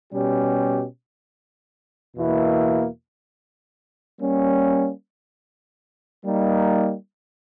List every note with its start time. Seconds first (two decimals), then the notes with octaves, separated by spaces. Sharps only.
0.12 B2 G3 C#4 G4
2.15 E2 B2 A#3 E4
4.19 G3 A#3 C#4
6.22 G3 A#3 D#4